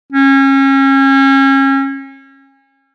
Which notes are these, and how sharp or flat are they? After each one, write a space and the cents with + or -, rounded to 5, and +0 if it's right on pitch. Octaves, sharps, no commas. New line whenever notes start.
C#4 -30